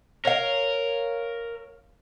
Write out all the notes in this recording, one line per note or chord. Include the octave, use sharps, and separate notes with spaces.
A#4 C#5 F5